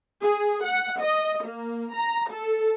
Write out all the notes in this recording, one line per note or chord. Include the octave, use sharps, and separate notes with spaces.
G#4
F#5
D#5
A#3
A#5
A4